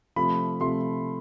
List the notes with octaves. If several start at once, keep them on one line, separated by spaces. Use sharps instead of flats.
C3 F3 A3 B5
C3 F3 A3 C6